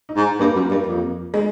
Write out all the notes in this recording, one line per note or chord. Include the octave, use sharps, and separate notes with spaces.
D#4
G#2
G2 A#3
F#2
G2
F2
G#3